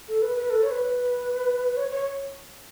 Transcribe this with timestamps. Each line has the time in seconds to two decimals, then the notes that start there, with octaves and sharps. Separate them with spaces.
0.08 A4
0.22 B4
0.36 B4
0.50 A4
0.63 C#5
0.71 B4
1.77 C#5
1.91 C#5